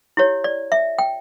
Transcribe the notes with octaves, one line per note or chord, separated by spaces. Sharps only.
E4 G4 C#5
D5
E5
G5